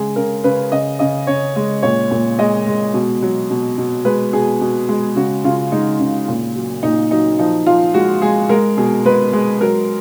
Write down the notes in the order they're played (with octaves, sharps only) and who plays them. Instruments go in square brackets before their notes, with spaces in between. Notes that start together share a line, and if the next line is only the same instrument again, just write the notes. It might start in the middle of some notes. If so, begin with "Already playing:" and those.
Already playing: [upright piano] C#3 G#3 G#4
C#3 A#4
C#3 B4
C#3 D#5
C#3 D#5
C#3 C#5
G#3
A#2 C#5
A#2
G#3 D#5
G#3
B2
F#3
B2
B2
G#3 B4
B2 G#4
B2
G#3
C#3 F#4
C#3 F4
G#3 D#4
C#3
A#2
F#3
A#2 D#4
F#3 D#4
F3 D#4
F3 F4
G#3 F#4
G#3 G#4
G#3 A#4
B2 G#4
G#3 B4
G#3
F#3 A#4